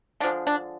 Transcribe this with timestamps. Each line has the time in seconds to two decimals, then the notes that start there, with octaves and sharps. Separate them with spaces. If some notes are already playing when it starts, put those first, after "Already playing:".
0.20 D3 D4
0.24 F3 G#3
0.47 D4